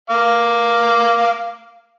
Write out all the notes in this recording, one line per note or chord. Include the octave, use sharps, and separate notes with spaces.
F5 D6